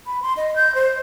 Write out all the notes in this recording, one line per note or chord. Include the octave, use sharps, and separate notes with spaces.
B5
C6
D#5
G6
C5